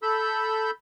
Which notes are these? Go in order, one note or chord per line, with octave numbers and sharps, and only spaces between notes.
A4 B5 E6 G6